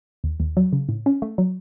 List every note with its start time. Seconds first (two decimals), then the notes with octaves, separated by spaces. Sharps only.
0.24 D#2
0.40 D#2
0.57 F#3
0.73 C#3
0.89 A2
1.06 C#4
1.22 A3
1.38 F#3